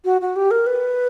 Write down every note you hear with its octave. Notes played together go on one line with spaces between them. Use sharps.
F#4
F#4
G4
A#4
B4